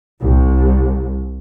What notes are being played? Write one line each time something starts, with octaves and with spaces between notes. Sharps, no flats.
C2